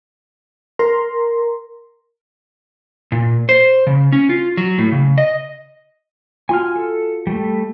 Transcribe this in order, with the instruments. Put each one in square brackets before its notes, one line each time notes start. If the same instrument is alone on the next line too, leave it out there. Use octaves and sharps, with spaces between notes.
[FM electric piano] A#4 A#5 C6
[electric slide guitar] A#2
C5
C#3
C#4
F4
F#3
A2
C#3
D#5
[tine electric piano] F4 F#4 [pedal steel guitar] G#5 C6 F6
[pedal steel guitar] A4
G3 A3